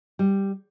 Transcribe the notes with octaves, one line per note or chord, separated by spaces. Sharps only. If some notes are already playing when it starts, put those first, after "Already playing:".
G3